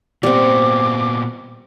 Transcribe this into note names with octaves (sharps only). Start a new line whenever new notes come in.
A#2 G3 B3 C4 D6